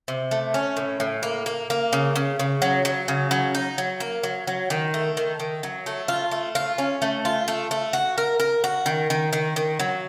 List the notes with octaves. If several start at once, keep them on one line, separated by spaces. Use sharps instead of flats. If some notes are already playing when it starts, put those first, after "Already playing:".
C3
A3
C#4
A2
A2
A#3
A#3
A#3
C#3
C#3
C#3
F#3
F#3
C#3
F#3
D#4
F#3
A#3
F#3
F#3
D#3
A3
D#3
D#3
F#3
A3
F4
A3
F4
C#4
A3
F4
A3
A3
F#4
A#4
A#4
F#4
D#3
D#3
D#3
D#3
F#3